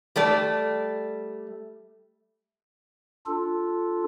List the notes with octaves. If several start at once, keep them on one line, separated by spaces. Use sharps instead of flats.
G3 A3 D5
D4 F4 A4